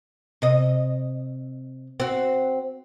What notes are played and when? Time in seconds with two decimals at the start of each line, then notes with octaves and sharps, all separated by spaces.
0.42 C3 D#5
2.00 C4 F#4